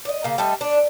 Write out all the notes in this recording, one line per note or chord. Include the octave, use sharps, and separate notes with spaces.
D5 D#5
C#3 A#3
G3 A3 A4 D#5
D4